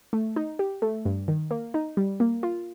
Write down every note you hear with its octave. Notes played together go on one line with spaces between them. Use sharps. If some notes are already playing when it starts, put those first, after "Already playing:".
A3
D#4
G4
A3
G2
D#3
A#3
D#4
G3
A#3
F4